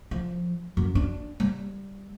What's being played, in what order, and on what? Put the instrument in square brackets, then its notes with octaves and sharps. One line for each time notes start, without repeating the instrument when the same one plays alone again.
[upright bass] F3
F#2
D4
G3